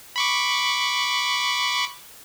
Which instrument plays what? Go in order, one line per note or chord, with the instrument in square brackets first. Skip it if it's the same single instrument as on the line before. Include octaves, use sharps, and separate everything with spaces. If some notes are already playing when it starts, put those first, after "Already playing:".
[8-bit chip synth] B5 C#6 D6